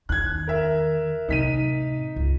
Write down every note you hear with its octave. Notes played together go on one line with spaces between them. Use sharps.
E2 D#3 F#6 G#6
A#4 E5
A2 C3 D#4 B6 D#7
C#2